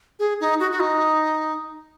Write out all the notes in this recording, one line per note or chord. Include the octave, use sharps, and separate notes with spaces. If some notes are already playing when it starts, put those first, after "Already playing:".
G#4
D#4
F#4
F#4
D#4